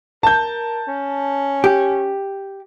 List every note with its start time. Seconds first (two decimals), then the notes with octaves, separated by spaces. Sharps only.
0.23 A#4 A5 G6
0.88 C#4
1.64 G4